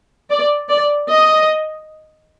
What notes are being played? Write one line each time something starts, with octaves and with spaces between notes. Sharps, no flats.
D5
D5
D#5